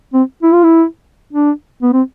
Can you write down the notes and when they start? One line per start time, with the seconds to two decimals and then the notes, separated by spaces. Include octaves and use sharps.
0.14 C4
0.43 E4
0.53 F4
0.64 E4
1.33 D4
1.82 B3
1.93 C4